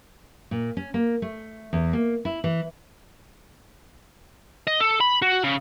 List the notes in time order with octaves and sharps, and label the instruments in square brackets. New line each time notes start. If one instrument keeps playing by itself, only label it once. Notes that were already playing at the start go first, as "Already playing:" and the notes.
[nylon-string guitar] A#2
C#4
A#3
A3
E2
A#3
E4
E3
[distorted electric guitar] D#5
A4
B5
F#4
C#3